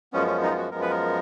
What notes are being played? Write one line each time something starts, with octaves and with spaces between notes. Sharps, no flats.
F#2 F3 G#3 B3 C#4
C#4
D#4
F4
F#4
F#2 F3 G#3 B3 A#4
B4
A#4